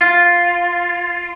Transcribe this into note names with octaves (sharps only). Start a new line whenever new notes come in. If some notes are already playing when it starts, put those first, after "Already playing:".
F4